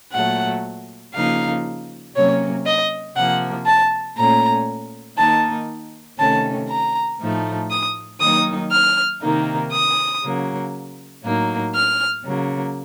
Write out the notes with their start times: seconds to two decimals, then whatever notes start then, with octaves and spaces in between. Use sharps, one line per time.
0.13 A#2 F#3 A3 F#5
1.15 C#3 F3 A#3 D#4 F5
2.15 C3 F#3 A#3 C#4 C#5
2.66 D#5
3.17 C3 F3 A#3 F#5
3.66 A5
4.17 A#2 A3 C#4 A#5
5.18 D#3 A#3 D#4 A5
6.19 C3 D#3 A3 C#4 A5
6.70 A#5
7.20 A2 F3 A3 D#4
7.71 D#6
8.21 D#3 F#3 A#3 D#4 D#6
8.72 F6
9.21 C3 D#3 A#3 D#4
9.72 D#6
10.22 C#3 F#3 A#3
11.24 A2 F#3 A#3 D#4
11.74 F6
12.24 C#3 F#3 A#3